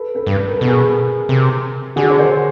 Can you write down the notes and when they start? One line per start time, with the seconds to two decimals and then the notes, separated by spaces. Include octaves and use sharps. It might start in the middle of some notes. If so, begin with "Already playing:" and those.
Already playing: A4 B4
0.15 A4 B4
0.26 G2
0.38 B4
0.47 A#4
0.57 B2 A4
0.67 G#4 A#4
1.29 C3
1.96 D3 F#4 G#4
2.10 C#5
2.19 A#4 C5